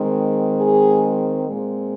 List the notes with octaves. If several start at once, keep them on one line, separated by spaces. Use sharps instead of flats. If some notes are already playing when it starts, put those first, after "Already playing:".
Already playing: D#3 G#3 C4
G#4
A#2 G#3 C4